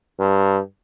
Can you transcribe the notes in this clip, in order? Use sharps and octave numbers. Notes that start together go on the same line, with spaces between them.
G2